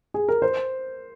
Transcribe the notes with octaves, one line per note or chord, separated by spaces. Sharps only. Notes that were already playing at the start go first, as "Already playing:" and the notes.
G#4
A#4
C5